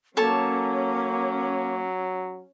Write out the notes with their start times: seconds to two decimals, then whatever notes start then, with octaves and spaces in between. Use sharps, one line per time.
0.17 F#3 A#3 C#4 A4 C#5 A5